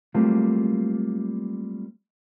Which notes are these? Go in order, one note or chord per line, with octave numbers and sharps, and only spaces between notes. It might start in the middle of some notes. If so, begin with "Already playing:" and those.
F#3 G3 A3 A#3 C4 F4